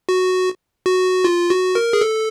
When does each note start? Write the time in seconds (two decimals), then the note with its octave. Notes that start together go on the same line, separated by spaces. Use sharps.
0.09 F#4
0.86 F#4
1.24 F4
1.50 F#4
1.75 A#4
1.93 G#4
2.01 A4